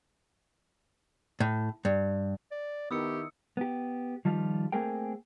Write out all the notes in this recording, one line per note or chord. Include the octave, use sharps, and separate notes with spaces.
A2
G2
D5
D#3 B3 E4 G4 D#6 E6 C#7
B3 G4
D#3 F3 G3 F4
A3 A#3 C4 G#4 A#4 G5